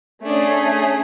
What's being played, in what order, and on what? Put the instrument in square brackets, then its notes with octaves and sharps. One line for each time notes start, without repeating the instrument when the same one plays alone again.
[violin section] A3 C#4 G#4 [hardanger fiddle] D4